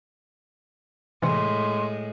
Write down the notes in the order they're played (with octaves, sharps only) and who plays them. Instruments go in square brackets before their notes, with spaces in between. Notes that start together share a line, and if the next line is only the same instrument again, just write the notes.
[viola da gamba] A2 G#3 [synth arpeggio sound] C3 E3 [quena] C6